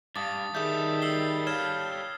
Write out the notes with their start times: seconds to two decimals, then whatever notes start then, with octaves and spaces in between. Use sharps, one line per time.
0.16 G2 F5 A5 D6 D#6 A6
0.55 D#3 G3 G#4 A4 E5 D#6 G6
1.02 E6 C7 G7
1.47 C#5 F5 F6 G#6 E7